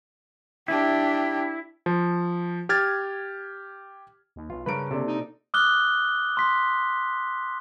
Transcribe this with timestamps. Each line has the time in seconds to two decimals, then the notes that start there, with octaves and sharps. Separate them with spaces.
0.68 D4 E4 G4
1.86 F3
2.69 G4 F6 G#6 A6
4.36 D#2
4.50 B1 F4
4.66 G2 C#3 A#4 B4 D7
4.91 C3 A#3 D4 A4
5.07 D#4
5.54 D6 D#6 F6 F#6 G7
6.37 C6 B6